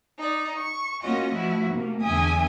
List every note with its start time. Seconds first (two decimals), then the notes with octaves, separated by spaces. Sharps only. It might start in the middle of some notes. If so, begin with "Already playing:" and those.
0.18 D#4 D5
0.54 C#6
1.02 A#3 C#4 F4 F#4 D#5
1.32 F3 A3 E4 F#4
1.70 C3 A3 A#3
2.01 E2 D3 E5 G5 G#5 D#6